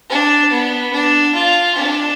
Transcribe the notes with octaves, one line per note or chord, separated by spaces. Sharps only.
D4
B3
D4
F4
D4